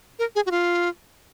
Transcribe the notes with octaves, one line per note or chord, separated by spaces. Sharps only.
A#4
G#4
F#4
F4